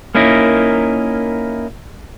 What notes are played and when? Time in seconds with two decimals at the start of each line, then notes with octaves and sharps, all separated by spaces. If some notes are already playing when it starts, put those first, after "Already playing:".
0.15 A#3 C#4 D#4 E4 A#4